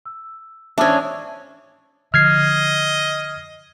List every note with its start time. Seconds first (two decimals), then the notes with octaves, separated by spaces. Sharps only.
0.06 E6
0.78 G#2 E3 C#4 D4 G#4 C5 E5
2.14 D3 F3 D#5 F6 G#6 C7